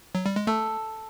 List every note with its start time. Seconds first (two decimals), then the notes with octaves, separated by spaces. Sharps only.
0.15 F#3
0.26 G3
0.36 G#3
0.47 A3 A4